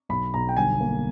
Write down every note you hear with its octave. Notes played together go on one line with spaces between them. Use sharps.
B1 B5
B1 A#5
G5
G1 G#5
A#3